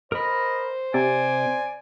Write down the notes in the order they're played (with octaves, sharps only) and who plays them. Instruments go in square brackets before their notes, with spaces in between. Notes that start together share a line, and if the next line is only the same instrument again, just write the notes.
[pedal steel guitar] A#4 B5 [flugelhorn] C5 [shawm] D#5
[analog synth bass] C3 [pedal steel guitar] D5 [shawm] G#5